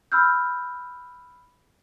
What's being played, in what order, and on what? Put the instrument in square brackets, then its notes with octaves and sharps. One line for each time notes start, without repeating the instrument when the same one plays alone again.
[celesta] B5 E6 F6 G6